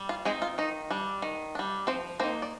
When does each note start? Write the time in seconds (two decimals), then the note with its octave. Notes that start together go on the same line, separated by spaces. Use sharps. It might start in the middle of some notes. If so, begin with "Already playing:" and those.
Already playing: G3
0.09 F4
0.25 G#3 C4 D#4 G#4
0.42 F4
0.58 D#3 D#4
0.91 G3 D4
1.22 D#3
1.55 G3 D4
1.87 F3 C4 C5
2.19 A#3 C4 D#4 C5
2.42 D5